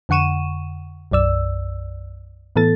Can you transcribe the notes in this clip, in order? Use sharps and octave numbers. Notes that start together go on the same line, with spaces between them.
F2 D3 F#5 C#6 D#7 E7
B1 F#2 D5 E6
A2 E3 B3 A4 A6